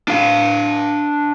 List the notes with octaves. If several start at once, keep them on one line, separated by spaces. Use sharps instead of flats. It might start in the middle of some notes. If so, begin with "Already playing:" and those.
D4 F5